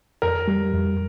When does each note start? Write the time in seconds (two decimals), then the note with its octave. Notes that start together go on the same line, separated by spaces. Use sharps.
0.22 F2 A#4
0.48 G3
0.73 F2